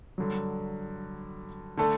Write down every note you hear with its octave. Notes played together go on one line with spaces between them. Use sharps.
G2 D3 F#3
D3 A3 D4 A4